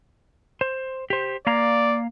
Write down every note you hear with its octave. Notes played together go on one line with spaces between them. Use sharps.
C5
G4 C5
A#3 D5 F5 A#5